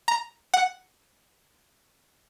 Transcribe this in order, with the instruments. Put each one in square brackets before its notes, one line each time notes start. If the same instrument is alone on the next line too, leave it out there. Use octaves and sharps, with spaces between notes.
[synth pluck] A#5
F#5